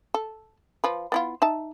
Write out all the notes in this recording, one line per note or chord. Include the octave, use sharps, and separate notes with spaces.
A4
F3 B4
B3 E4 F4
D#4 E5 A5